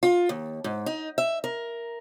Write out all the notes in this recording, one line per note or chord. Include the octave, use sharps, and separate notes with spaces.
F4
D#2
G#2
D#4
E5
A#4